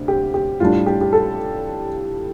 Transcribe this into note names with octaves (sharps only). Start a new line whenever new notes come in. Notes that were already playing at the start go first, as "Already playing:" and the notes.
Already playing: D2 C3
G4
G4
A2 G3 D4 F4
G4
G4
A4